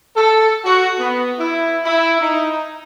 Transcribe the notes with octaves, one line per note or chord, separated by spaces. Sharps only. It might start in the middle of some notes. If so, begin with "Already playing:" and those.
A4
F#4
B3
E4
E4
D#4